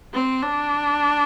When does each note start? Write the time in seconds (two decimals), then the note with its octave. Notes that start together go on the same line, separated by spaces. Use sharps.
0.13 C4
0.42 D4